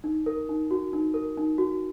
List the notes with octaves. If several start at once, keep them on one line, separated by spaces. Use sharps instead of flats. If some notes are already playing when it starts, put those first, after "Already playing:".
D#4
A#4
D#4
F#4
D#4
A#4
D#4
F#4